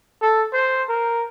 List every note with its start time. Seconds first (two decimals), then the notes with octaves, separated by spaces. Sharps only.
0.22 A4
0.53 C5
0.89 A#4